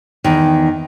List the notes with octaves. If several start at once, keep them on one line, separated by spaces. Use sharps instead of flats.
E2 D#3